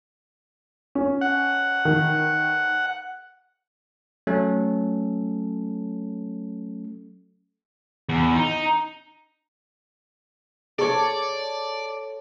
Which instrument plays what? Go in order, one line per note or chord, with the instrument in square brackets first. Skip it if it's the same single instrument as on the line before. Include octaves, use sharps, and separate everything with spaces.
[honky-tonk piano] C#4
[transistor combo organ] F#5
[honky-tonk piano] D#3
[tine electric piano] F#3 A3 C#4 A4
[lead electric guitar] E2
D#4
[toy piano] G#4 C#6 [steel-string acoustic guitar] A4 C#5 [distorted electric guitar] D5